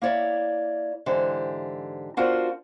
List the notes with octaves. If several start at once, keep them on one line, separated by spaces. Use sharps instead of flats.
A#3 E4 C#5 D5 E5
G#2 D3 E3 G4 C5
B3 D4 F4 F#4 A#4 C5